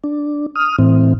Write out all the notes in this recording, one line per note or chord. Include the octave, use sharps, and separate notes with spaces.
D4
D#6 F6
A2 E3 C4